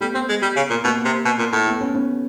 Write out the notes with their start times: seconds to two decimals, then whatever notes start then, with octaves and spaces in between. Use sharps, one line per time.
0.01 G3 A3 B3
0.15 C4
0.29 G#3
0.42 G3
0.56 C#3
0.70 A#2
0.84 B2 A#3 C4
1.05 C3
1.25 B2
1.39 A#2
1.53 A2
1.66 A3 B3
1.80 B3 C#4
1.94 B3 C#4